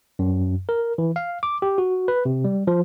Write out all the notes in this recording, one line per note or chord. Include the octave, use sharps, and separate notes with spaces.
F#2
A#4
E3
F5
D6
G4
F#4
B4
C3
G3
F3